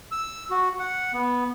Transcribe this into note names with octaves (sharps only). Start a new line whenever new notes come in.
E6
F#4
F#5
B3